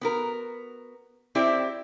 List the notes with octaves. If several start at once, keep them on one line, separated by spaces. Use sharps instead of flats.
B3 F#4 A#4
C4 E4 G4 D5